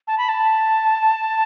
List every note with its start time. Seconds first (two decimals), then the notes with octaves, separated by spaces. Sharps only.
0.07 A5
0.18 B5
0.29 A5